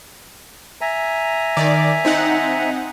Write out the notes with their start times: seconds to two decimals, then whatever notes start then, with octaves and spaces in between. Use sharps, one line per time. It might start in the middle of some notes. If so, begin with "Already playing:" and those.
0.81 E5 G#5 A#5
1.57 D#3 D5
2.05 C4 D#4 F#5